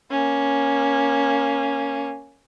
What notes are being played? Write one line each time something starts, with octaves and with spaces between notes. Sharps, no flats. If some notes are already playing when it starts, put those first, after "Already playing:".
A#3 C#4